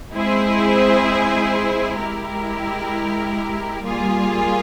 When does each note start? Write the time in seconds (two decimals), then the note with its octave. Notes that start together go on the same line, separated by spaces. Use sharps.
0.12 G#3 C4 E4 G#4 C5
1.98 G#3 E4 G4 A#4
3.83 G3 A#3 F4 G#4